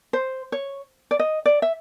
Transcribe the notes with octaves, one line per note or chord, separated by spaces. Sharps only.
C5
C#5
D5
D#5
D5
E5